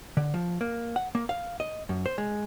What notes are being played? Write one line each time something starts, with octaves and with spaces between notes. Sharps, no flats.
D3
F3
A#3
F#5
A#3
F5
D#5
F#2
C5
G#3